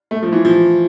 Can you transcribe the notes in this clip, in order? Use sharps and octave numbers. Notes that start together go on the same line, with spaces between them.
A3
F3
E3
F3